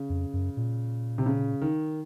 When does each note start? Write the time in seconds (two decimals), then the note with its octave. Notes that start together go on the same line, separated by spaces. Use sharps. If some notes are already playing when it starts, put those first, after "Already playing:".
Already playing: C#3
0.10 F2
0.33 F#2
0.57 A#2
1.18 C3
1.26 C#3
1.61 D#3